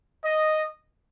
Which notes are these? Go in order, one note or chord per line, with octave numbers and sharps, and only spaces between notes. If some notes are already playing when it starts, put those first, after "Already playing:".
D#5